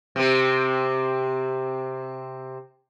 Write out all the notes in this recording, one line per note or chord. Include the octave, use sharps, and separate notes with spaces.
C3 C4